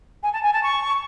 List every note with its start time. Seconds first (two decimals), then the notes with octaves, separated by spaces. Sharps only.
0.23 G#5
0.33 A5
0.43 G#5
0.53 A5
0.63 C#6